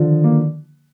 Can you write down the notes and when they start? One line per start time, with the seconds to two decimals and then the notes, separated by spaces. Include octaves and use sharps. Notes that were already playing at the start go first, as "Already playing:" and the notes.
Already playing: D3 D#3 F3
0.24 A#3